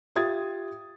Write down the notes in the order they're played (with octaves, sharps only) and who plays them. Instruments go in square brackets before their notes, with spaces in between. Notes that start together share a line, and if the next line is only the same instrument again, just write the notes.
[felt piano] F4 G4 E5 D#6 G#6 A6